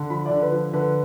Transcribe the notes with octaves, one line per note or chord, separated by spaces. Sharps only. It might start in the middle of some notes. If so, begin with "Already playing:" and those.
Already playing: D3
F3 B5
D3 D5
B4
F3
D3 B4